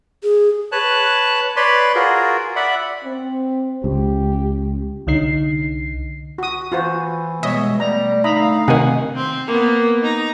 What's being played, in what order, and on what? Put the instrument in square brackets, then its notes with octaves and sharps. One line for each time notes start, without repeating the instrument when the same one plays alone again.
[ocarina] G#4
[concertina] B4 C#5 A5 F#6
B4 C#5 D5 B5 C6
F4 F#4 G#4 A#4
D5 E5 F#5 B5
[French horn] C4
[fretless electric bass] C#2 [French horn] G4
[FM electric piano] C2 D3 D#4 C7
[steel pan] F#4 D#6
[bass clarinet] E3 [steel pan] F4 F#4 C5
[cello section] B2 G3 G#3 [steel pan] C#5 E5 [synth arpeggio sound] D#5
[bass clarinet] G3 [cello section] A3 [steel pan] A#5
[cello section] D3 A3 F5 [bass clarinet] D#4 [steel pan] E5 A#5 B5
[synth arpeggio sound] C3 D#3 [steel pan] F#5 G#5
[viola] C4
A#3 B3
D#4 A#5